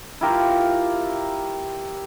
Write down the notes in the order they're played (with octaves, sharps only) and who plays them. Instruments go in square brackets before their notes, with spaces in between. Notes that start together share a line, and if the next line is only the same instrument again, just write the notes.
[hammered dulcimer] E4 F4 G4 A#4